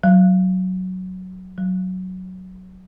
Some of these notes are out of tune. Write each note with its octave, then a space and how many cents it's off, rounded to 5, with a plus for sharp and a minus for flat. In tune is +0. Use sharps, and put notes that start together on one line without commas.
F#3 +5
F#3 +5